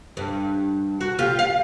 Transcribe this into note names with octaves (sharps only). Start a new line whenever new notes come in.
G2
F#4
F4 G4
F5